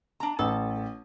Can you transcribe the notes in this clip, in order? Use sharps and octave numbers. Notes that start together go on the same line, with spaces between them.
D4 A#5
A1 A4